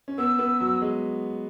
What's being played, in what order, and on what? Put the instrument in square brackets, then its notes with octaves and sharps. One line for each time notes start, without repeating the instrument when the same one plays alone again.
[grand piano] C#4
[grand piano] B3 [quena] E6
[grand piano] B3
F#3
G#3